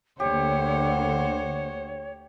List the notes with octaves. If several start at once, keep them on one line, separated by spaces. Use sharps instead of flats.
D2 D3 A#3 G4 C5 C#5 F#5